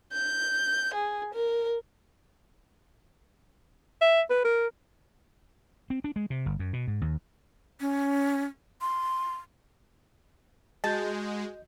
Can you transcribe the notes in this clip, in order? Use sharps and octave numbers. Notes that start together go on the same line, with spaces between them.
G6
G#4
A#4
E5
B4
A#4
C4
D4
G#3
C3
G1
F#2
B2
G#2
D#2
C#4
C6
G#3 F#4 D#5 A5 G6